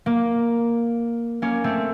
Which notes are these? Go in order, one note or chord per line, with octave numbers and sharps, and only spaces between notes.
A#3
A#3 C#4
A3 C4